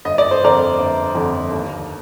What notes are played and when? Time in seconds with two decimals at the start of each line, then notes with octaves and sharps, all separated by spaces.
0.05 G1 D#5
0.18 D5
0.31 C5
0.41 F2 D3 A#4 D5
0.78 G1
1.15 F2 D3
1.51 D#2